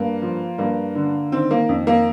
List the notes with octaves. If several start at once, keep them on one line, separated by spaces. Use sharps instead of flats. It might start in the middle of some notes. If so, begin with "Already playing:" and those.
Already playing: G2 A#3
F3
G2 A#3
D3
D#3 C4
A#3
F2
A#3